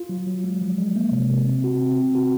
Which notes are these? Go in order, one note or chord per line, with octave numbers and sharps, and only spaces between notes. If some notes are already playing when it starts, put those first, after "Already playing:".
Already playing: F4
F#3
F#3
G#3
F3
G#3
A#3
C3
C3
C4
F#4
C4
C4
F#4